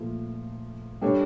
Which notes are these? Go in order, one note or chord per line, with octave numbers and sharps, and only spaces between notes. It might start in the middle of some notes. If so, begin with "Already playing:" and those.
Already playing: A#2 F3 A3
G3 D4 A4 C#5